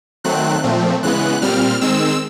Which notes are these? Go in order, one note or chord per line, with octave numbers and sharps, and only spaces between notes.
D#3 F#3 A3 C4 F#6
A#2 F3 A3 C4
C#3 E3 G#3 B3 F#6
A#2 G3 C4 F6
D#3 G#3 C4 E6